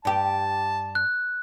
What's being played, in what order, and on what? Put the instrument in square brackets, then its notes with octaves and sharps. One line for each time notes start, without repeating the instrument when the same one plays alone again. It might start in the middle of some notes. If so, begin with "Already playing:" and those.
[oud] G2 G4 [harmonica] A5
[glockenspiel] F#6